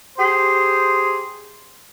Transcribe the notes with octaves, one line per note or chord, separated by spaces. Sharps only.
G4 G#4 C5